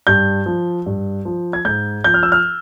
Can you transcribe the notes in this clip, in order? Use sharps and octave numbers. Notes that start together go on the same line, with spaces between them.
G2 G6
F3
G2
F3
G#6
G#2 G6
F3 G6
F6
E6
F6